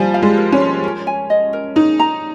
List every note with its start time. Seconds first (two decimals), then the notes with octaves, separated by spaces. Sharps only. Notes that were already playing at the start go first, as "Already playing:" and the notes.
Already playing: F3 G3 G#5
0.14 F5
0.22 G#3
0.37 A#4
0.52 C#4
0.60 F4
0.84 A#4
1.07 G#5
1.30 D#5
1.53 A#4
1.76 D#4 G#4
1.99 A#5